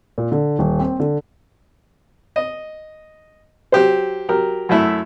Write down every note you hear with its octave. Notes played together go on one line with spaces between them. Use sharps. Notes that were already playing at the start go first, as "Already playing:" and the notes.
A#2
D3
D#1
C4
D3
D#5
F#3 G4 C5
F#3 G4 A#4
F#2 F#3 A3 E4